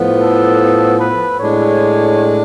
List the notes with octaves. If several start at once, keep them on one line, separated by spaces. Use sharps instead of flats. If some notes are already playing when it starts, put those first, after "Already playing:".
Already playing: A2 F3 B3
A4
B4
A2 G#3 D4 C#5